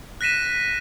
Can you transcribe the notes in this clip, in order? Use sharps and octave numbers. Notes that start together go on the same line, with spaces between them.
F#6 A#6 B6 D#7 E7